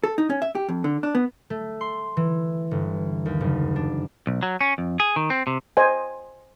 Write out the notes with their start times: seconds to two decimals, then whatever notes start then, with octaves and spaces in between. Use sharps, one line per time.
0.04 A4
0.18 D#4
0.30 C#4
0.42 E5
0.55 G4
0.69 F2
0.84 D3
1.03 D4
1.15 B3
1.50 A3
1.81 C6
2.17 E3
2.71 G1
3.26 D#2
3.41 F#1
3.76 D4
4.27 B1
4.43 F#3
4.61 C#4
4.78 F2
5.00 G#4
5.16 D#3
5.30 C4
5.47 C3
5.77 C5 D#5 G#5